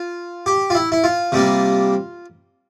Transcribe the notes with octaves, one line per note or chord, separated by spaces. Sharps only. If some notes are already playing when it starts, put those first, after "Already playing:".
Already playing: F4
G4
F4
E4
E4
F4
C3 G3 A#3